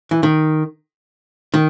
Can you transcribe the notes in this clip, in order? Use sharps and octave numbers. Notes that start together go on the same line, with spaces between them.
E3
D#3
D#3